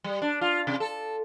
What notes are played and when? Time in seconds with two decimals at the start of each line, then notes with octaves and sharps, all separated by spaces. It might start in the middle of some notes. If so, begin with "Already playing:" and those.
0.04 G3
0.22 D4
0.41 F4
0.67 C3
0.80 A4